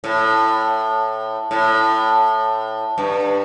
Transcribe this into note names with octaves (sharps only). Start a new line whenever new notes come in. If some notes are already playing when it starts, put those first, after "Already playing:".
A2
A2
G2